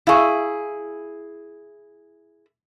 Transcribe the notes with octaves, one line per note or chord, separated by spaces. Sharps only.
E4 G#4 F5 C#6